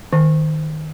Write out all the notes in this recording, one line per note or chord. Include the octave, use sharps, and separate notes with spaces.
D#3